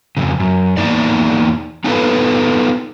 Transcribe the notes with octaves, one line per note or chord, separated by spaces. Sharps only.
F2 C#3
F#2
E2 D#3 A#3 D#4 D5
B3 D#4 F4 G4 A4 B4